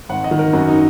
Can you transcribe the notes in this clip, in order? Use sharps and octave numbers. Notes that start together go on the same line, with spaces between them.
G#1 F#5
D#5
D#3
A#4
F#2 F#4
D#4